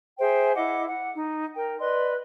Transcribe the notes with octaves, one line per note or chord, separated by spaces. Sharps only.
G#4 C5 E5 G5
E4 D#5 F#5 D6
F#5
D#4
A#4 G5
B4 D5 D#5 C6